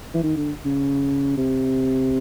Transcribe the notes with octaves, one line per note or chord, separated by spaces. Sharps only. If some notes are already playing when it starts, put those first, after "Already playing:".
E3
D#3
D3
C#3
C3